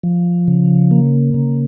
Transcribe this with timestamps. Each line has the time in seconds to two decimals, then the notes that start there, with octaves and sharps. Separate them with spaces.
0.03 F3
0.48 C#3
0.91 A#3
1.34 C#3